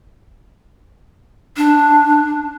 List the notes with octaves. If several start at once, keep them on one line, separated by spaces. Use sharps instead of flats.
D4